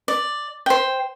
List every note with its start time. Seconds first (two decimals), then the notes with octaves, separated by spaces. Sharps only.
0.08 D5
0.66 C5 G5